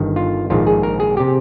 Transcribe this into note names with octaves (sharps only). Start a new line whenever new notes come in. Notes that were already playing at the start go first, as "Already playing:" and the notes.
Already playing: G1 G2 D#3
F4
A#1 G#2 D#3 F4
G#4
A#4
G#4
C3 G4